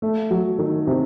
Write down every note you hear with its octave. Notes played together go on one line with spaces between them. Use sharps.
A3
F#3
D#3
C3